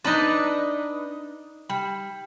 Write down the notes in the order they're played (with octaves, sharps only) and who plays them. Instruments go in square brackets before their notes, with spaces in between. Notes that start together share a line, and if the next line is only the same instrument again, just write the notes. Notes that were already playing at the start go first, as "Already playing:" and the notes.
[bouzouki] D4 B4 D5 [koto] D#4 A5
[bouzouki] G3